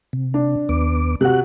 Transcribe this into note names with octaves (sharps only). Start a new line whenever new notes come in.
C3
D4
D#2 B3 D6
C3 F#4 F#6